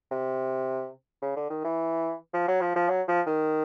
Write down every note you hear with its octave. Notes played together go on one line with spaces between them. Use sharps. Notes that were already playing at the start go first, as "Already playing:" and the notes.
C3
C#3
D3
D#3
E3
F3
F#3
F3
F3
F#3
F3
D#3